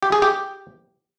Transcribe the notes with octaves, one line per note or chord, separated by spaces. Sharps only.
G4
G#4
G4